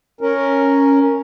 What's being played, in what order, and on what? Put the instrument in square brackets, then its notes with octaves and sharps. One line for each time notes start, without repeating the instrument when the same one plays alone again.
[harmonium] C#4 A#4